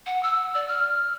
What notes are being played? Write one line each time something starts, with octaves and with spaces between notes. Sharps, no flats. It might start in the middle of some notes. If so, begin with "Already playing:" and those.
F#5
E6
D5
F6